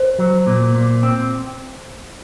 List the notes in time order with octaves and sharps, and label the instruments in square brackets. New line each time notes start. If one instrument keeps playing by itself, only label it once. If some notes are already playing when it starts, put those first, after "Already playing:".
Already playing: [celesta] C5
[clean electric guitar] F#3
A#2
A#2
C4